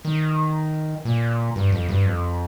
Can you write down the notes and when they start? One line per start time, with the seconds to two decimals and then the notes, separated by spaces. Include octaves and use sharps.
0.05 D#3
1.05 A#2
1.56 G2
1.72 F2
1.89 G2
2.06 F2